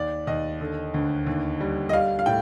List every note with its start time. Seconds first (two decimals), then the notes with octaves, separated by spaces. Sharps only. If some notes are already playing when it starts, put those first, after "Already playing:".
Already playing: D#2 D5
0.27 D#2 D#5
0.61 D3
0.94 D2
1.27 D#2
1.61 G3
1.89 D#5
1.93 G3 F5
2.19 F5
2.26 A2 G5